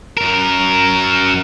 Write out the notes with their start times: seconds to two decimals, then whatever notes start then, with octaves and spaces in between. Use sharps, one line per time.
0.17 F#2 A#4